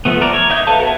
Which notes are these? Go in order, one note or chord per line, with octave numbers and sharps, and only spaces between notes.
F3 A3 B3
A3 A#4 D5
C#5
D#4 E5 G6
A4 B4 E5 F5 A5
B3 F#4 A#4 C#5